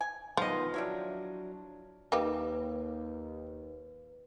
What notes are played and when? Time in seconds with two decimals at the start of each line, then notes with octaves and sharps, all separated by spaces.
0.01 G#5
0.37 D#3 F3 B3 F4 B4 D#5
0.74 F#3 G3 D4 E4 C#5
2.12 D#2 A#3 D#4 G4 B4